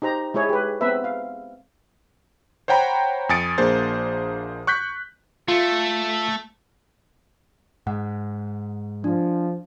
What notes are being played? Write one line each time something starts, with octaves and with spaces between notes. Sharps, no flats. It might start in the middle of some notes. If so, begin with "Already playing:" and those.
D#4 G4 C5 A#5
G#3 E4 G#4 C#5
G4 B4
B3 C4 B4 E5
F5
C5 C#5 F#5 G5 A#5 B5
F2 G#5 D#6 A6 C#7 D7
A#1 A#3 D4 G#4 C5 A6
C#6 F#6 G6 B6
A3 F4
G#2 F#5
F3 D4